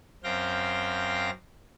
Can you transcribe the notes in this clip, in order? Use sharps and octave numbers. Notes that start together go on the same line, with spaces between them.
F#2 C4 F5 G5 A#6